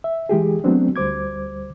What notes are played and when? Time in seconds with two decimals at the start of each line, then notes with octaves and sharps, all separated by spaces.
0.04 E5
0.29 E3 G#3 G4 G#4
0.64 F#3 A3 B3 C4 D4
0.96 D2 G3 C5 D6 G#6